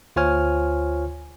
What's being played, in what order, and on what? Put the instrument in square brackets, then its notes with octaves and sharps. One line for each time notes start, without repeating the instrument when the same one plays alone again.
[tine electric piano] D2 F4 C5 C#5 G#5 F6